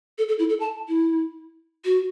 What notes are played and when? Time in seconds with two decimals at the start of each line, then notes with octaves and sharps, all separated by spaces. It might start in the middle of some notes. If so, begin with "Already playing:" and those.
0.18 A4
0.28 A4
0.39 E4
0.49 A4
0.60 A5
0.88 E4
1.85 F#4